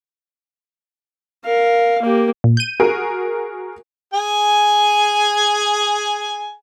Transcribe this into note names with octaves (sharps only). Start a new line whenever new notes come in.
A#4 F5
A#3 G4
A#2
G6 D#7
F#4 G#4 A#4
G#4 G#5